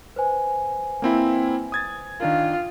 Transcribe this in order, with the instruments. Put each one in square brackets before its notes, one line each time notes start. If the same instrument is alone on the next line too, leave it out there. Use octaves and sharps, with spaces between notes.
[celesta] B4 C5 G#5
[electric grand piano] A#3 C4 E4
D#6 G#6 A6
[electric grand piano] D#3 D4 A#4 [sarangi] F4